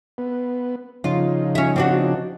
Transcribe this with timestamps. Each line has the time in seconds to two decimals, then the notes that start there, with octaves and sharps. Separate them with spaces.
0.18 B3
1.04 C#3 F3 D#4 F4
1.55 C#4 E5
1.76 C4 D4 F#4